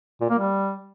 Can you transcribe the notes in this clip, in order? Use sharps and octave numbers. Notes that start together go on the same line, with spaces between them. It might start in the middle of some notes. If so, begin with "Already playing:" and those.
A#2
A#3
G3